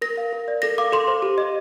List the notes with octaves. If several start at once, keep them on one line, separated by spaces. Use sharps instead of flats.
A#4 A#6
F5
A#4
D5
A4 A#6
F5 D6
A4 C6
C5
G4
D#5